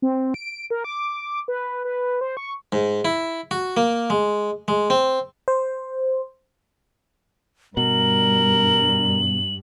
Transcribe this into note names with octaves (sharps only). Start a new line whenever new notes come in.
C4
D7
A#4
D6
B4
B4
C5
C#6
G#2
E4
F#4
A#3
G#3
G#3
C4
C5
G2 B2 A#4 F#7